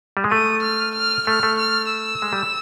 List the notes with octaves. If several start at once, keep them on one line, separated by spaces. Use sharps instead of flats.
G3
G#3
A3 D#6
F6
F6
A3 F6
A3
F6
E6
G#3
G3